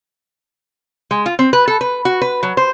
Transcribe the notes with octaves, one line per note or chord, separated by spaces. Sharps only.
G#3
F4
C4
B4
A4
B4
F#4
B4
F#3
C5